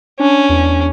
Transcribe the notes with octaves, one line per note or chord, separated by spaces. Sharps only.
C#4 D4
E2